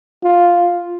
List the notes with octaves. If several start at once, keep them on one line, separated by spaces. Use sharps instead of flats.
F4